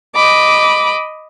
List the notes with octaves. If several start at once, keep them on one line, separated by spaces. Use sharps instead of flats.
D#5 B5 D6